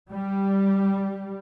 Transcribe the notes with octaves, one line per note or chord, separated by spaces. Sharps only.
G3